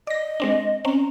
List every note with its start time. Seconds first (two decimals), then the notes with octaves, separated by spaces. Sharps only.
0.07 D5 D#5 A#6
0.40 G#3 C4 D4
0.85 C4 C#4 A#5